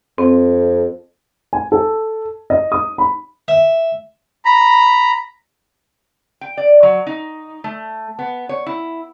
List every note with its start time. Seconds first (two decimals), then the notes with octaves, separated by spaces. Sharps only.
0.18 F2 C4
1.53 G#5
1.72 A4
2.50 D#5
2.72 D#6
2.98 B5
3.48 E5
4.45 A#5 B5
6.41 G5
6.57 D5
6.83 F#3
7.07 D#4
7.64 A3
8.19 B3
8.49 C#5
8.66 E4